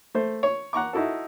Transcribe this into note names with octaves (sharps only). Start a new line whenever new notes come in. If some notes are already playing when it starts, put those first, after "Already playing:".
A3 C5
C#5
F#5 A#5 C#6 D6
D#4 E4 F#4 A4